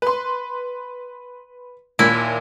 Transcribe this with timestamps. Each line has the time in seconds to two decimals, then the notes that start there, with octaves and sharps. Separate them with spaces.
0.02 B4 C6
1.99 D#2 A#2 E4